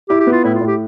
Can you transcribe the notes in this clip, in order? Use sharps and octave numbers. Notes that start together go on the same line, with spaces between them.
E4 G4
G4
B3
F4
A2 E4
F4
A2
G4